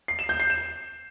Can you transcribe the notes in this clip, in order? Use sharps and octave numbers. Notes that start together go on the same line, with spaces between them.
C7
E7
G6
C7
E7